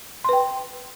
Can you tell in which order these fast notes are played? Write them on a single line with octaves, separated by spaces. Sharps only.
C6 B4 G5